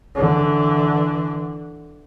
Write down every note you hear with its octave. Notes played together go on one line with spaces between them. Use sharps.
D3 E3